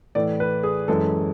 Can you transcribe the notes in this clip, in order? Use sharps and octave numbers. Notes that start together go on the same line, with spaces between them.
A2 E3 A3 D5
B4
G#4
F#2 E3 G#3 A4